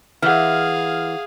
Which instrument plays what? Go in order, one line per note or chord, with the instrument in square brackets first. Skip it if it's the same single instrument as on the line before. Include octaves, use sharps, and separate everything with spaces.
[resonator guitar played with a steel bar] E3 [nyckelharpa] G#4 F5 [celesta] F#5 F6